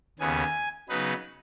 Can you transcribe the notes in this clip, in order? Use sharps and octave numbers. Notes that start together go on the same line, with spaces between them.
D#2 C#3 B3 G#5
C#3 F#3 B3 D#4 B4